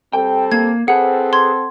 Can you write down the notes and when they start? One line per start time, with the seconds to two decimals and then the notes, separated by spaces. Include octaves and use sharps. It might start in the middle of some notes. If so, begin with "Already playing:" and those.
0.13 G3 C4 A4 G5
0.52 A#3 G#6
0.88 C4 G#4 A4 B4 F#5
1.33 C6 G#6